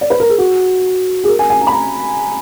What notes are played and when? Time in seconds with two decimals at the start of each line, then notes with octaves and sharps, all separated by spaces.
0.01 D5
0.10 B4
0.20 A#4
0.29 G#4
0.38 F#4
1.24 G#4
1.28 A#4
1.39 G#5
1.50 G#5
1.61 A#5
1.67 B5
1.72 A#5